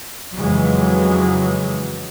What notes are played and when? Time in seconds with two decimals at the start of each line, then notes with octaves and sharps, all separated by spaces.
0.35 F2 C#3 E3 F#3 G#3